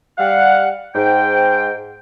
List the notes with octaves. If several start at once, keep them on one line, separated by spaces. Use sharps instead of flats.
G3 F5 F#5
G#2 G5